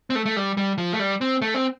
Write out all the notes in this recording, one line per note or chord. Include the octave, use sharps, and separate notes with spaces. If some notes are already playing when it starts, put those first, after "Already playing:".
C4
A3
A3
G3
G3
F3
A3
G3
C4
A3
C4